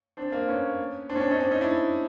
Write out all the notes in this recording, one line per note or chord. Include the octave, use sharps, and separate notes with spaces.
C4 D4
A#3 C4
B3 C#4
C4 D4
C#4
C4 D4
C#4 D#4
C4 D4
C#4 D#4
D4 E4